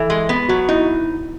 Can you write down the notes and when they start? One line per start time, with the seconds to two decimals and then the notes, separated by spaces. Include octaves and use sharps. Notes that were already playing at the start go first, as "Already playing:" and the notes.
Already playing: E3 A4
0.10 G#3
0.29 B3
0.49 F#3 F#4
0.69 D#4 E4